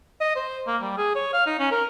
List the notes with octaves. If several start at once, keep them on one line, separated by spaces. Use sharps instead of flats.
D#5
C5
A#3
G3
G#4
C#5
F5
D#4
C#4
A#4